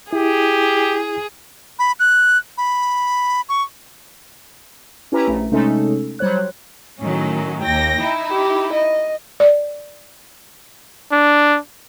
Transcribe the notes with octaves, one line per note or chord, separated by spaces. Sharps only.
E4 G4 G#4
B5
F#6
B5
C#6
C#4 E4 G4 B4 A#5
A#1 A3
C3 G#3 A3 C#4 D#4 A4
F#3 G3 C5 C#5 F#6
A2 D#3 F#3 C#4
D#2 G5 A#6
D#4 E4
G4
D#5
D5
D4